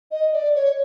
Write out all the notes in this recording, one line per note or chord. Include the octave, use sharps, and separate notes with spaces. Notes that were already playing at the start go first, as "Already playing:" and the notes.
D#5
D5
C#5